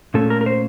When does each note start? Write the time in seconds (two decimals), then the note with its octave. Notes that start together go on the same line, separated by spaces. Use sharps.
0.14 A#2 A3 C#4 A4
0.30 A#4
0.41 A#4
0.46 C5